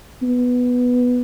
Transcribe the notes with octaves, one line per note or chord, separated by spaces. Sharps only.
B3